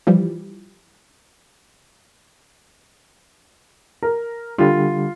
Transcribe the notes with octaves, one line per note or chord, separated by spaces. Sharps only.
E3 F3 G3
A#4
D3 G3 F4